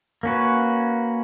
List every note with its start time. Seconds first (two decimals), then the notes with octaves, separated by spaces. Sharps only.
0.23 A#3 C#4 F#4 B4